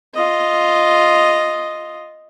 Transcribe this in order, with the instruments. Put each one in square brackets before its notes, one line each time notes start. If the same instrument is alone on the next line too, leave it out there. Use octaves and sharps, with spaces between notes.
[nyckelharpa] F4 D#5